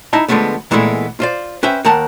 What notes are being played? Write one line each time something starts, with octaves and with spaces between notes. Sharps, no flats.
D#4 E4 D#5 A5
D3 D#3 F3 G#3 A3 B3
A#2 E3 G#3 A3 B3 E4
F4 C5 D5
C#4 B4 C5 E5 G5
D#2 D#3 A#4 F#5 A5